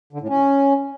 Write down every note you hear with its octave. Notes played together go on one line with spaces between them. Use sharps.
D3
A2
C#4